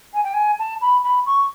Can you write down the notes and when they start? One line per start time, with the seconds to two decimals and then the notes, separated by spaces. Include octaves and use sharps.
0.14 G#5
0.24 G5
0.34 G#5
0.59 A5
0.81 B5
1.04 B5
1.26 C#6